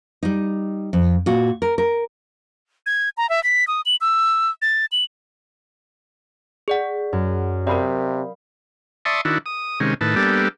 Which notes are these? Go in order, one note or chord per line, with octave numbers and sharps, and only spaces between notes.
G3 D#4
F2
A#2 F#4
A#4
A#4
G#6
A#5
E5
B6
D#6
F#7
E6
A6
F#7
G#4 D5 F#5
F#2
C3 A#4 D5 F5 B5 F6
D5 E5 A5 C6 C#6 D#6
D#3 D4 E4 F#4
D#6
C3 D#3 G#3 C#4
A2 D#3 B4 A5
G3 A#3 B3 D4 G4 A4